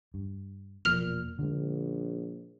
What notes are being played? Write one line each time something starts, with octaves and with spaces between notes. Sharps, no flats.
G2
E1 A#2 F3 B3 F6 F7
A#1 D3 G#3